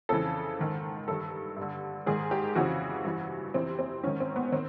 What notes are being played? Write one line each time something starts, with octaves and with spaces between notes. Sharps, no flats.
F2 C#3 E3 A4
G#2 D#3
G2 D#3 A4
G2 D3
G#2 D#3 G#4
G4
F2 C#3 E3 F#4
G2 E3
F2 C3 E3 C4
C4
G#2 D#3 C#4
C4
B3
D#3 C4